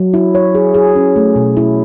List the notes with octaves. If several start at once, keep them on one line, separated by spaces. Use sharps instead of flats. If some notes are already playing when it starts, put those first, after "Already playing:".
Already playing: F#3
E4
C#5
G#4
G#4
C#4
A3
B2
E4